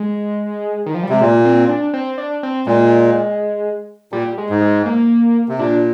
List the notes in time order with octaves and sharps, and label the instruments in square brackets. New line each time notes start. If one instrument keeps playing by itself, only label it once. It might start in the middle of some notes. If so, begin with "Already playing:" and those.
Already playing: [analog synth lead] G#3
D#3
F3
G3
[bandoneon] C3 [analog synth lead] G#3
[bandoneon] A#2 [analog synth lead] A#3
[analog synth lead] C4
D4
C4
D4
C4
[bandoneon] A#2 [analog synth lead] G#3
[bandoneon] A#2 [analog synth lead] G3
[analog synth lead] G#3
[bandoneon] G#2
[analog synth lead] G#3
A#3
[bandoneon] C3
[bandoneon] A#2 [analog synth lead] D4